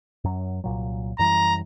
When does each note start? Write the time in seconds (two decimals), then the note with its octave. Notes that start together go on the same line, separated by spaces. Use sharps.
0.24 F#2 F#3
0.64 C2 A#2 F#3
1.19 F#2 E3 G3 A#5